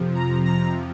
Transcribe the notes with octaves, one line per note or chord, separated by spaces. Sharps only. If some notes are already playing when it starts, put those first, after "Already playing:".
Already playing: F2 C3 F3
A#5
A#5